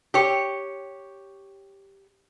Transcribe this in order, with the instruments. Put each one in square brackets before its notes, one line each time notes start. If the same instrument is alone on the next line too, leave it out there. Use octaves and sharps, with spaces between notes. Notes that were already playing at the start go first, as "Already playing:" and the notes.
[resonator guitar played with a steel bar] G4 C#5